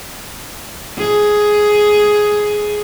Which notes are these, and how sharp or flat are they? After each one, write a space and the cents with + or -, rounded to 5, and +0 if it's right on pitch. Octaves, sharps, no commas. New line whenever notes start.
G#4 +5